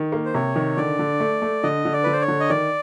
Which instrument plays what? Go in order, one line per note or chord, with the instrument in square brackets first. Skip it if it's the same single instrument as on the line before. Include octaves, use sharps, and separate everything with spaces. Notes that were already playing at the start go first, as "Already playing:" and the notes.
Already playing: [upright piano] D#3
A#3
[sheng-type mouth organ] C5
[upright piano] C3 [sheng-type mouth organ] C#5
[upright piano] D#3
[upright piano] D3 [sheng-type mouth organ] D5
[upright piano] D3
A3
A3
[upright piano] D3 [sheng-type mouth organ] D#5
[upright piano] D3
[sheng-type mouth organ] D5
[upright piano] D3 [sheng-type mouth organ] B4
[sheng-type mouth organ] C5
C#5
[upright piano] D3
[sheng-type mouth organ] D#5
[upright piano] D#3 [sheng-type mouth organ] D5